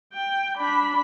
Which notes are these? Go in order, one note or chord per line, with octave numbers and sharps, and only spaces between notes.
G5
D4 B5